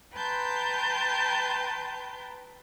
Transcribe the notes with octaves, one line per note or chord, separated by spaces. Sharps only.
B4 G5 A5 A#5 C6 G6